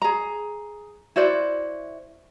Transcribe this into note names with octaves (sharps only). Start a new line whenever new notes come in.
G#4 A#5
E4 F#4 C5 D5